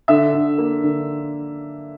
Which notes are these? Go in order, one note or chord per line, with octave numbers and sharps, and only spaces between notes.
D3 E5
D3
A#3
D3